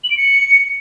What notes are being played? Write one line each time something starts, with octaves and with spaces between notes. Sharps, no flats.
F#7
D7
C#7